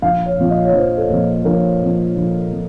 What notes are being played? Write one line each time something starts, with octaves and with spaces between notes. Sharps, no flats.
A#1 F5
C#5
A#2 F3
D#5
C#5
A#1 C5
A4
A#2 F3
A#1 A#4
A#2 F3
A#1
F3